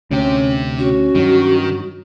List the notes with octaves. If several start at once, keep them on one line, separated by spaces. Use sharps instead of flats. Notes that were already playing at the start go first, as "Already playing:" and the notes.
D2 C3 C#4 G4
C#4 F#4
G2 D#3 F#3